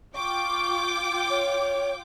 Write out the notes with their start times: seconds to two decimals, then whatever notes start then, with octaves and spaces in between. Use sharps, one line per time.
0.16 F4 G5 C#6 D6
1.30 C#5